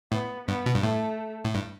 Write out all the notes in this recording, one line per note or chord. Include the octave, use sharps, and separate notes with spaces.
A2 B3
G2 B3
B2
G2
A2 A3
A2
G2